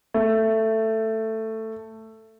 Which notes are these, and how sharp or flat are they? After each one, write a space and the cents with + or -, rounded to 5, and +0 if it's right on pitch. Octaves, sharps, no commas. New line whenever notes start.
A3 +10